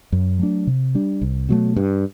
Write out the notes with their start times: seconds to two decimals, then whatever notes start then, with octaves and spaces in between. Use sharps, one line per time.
0.12 F#2
0.39 F#3 A3 D4
0.67 C3
0.95 G3 D4
1.21 C2
1.49 B2 F#3 A3
1.76 G2